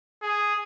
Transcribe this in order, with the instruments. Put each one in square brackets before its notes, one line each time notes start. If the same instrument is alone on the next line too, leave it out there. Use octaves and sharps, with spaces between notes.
[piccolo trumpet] G#4